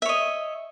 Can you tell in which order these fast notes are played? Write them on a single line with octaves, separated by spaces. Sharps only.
E5 C#5 D#5